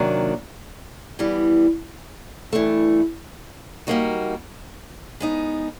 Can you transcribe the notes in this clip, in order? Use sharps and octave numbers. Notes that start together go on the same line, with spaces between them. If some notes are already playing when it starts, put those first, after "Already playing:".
Already playing: C3 D#3 F#3 A#3 D4
E3 G3 B3
G2 E3 A3
G3 A#3 D#4 F#4
G#3 B3 D#4